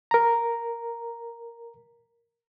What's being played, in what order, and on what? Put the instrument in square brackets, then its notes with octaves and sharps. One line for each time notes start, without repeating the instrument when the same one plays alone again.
[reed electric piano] A#4 A#5